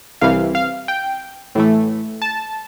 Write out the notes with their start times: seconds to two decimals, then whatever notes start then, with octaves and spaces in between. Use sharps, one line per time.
0.21 C2 C3 E3 F5
0.55 F5
0.88 G5
1.55 A2 E3 A3
2.22 A5